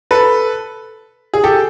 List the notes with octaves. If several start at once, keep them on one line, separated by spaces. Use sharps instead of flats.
A4 B4
G#4
G4 A4